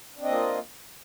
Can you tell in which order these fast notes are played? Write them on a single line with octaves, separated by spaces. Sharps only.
D4 C4 D#5 A#3 F4